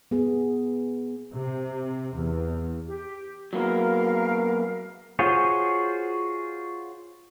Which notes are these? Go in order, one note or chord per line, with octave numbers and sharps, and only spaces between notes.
B3 G#4
C3
E2
G4
F#3 A#3 B3 A#4 F5
F4 F#4 G#4 C5 C#5